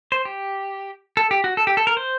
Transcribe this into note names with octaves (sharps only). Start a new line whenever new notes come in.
C5
G4
A4
G4
F#4
A4
G4
A4
A#4
C5